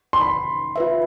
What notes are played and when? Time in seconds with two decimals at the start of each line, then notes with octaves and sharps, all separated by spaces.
0.13 C6
0.21 B5
0.76 F4 B4 E5